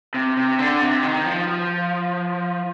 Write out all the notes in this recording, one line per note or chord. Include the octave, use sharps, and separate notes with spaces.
C3
C3
D3
C3
D#3
F3
F3